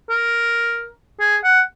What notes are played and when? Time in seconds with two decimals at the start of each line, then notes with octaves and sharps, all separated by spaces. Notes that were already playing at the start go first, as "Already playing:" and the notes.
0.10 A#4
1.20 G#4
1.44 F#5